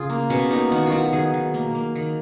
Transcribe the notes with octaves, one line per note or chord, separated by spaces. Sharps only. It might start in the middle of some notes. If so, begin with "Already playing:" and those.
Already playing: C#3 F4 G#4
A#3
B2 C#4
A#3 D#4
D#3 F#4
F4
F#3 F#4
D#3 G#4
D#3
A#3
A#3
D#3